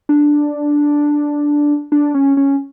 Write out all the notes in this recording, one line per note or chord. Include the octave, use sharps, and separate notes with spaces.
D4
D4
C#4
C#4